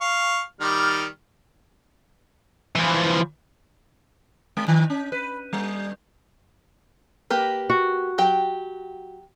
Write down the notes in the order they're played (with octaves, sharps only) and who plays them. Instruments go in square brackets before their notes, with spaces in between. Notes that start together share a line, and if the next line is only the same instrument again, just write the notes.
[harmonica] F5 C#6
D#3 G3 F6
[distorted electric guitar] E3 F3
[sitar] G#3
D#3
C#4
B4
G3
[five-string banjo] A#3 G4 B4
[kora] F#4
[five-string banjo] F#3 G4 G5